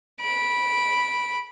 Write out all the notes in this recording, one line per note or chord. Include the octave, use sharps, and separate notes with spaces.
B5 D7